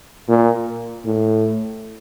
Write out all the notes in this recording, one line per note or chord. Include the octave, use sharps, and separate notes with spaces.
A#2
A2